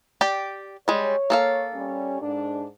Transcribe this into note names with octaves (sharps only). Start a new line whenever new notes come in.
G4 D5 G5
G3 G#3 C#5
A#3 A4 F5
G3 C#4
G#2 D4